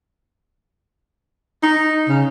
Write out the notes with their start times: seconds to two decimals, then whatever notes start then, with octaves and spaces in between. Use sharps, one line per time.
1.63 D#4
2.08 C#3